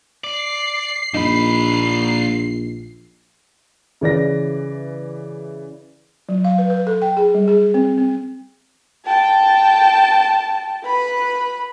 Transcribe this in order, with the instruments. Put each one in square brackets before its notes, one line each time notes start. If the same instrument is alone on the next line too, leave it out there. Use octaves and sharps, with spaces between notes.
[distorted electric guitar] D5 [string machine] C7
[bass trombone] A#1 [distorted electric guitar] A#2 B5 [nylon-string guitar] D#4
[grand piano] C#3 E3 D5 A#6
[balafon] F#3
F5
B4
B4
A4
G5
G#4
G3
G#4
C4
C4
[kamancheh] G5 A5
B4 B5